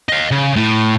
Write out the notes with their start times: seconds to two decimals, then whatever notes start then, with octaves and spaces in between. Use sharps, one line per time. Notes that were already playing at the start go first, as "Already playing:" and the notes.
0.09 D#5 F5
0.31 C#3
0.56 A2